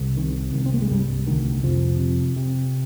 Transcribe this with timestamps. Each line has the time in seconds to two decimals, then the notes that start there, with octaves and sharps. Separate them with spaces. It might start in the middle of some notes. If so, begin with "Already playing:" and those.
Already playing: C2
0.17 C3 D#3
0.53 C2 D#3
0.66 C4
0.74 A#3
0.81 G#3
0.90 C2 G2 G3
1.27 D2 D#3
1.63 F2 C3 F3
1.99 C3
2.36 C3